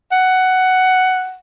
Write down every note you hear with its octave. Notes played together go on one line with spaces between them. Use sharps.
F#5